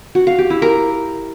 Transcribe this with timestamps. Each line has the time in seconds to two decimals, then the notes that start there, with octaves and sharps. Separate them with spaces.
0.15 F#4
0.27 F5
0.39 G4
0.50 E4
0.62 A#4